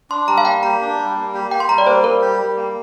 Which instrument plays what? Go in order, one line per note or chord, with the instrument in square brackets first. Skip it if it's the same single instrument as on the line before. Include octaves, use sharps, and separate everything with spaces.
[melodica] D4 [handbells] C6
[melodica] G3 [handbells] A#5
[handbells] F5
[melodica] A#3 [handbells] G5
[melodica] G4 [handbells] A#5
[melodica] D4
G3
A#3
G4
[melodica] G4 [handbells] G5
[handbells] C6
[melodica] G3 [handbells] A#5
[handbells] D5
[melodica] A#3 [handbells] C5
[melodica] G3 [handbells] A#4
[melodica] G4
G3
A#3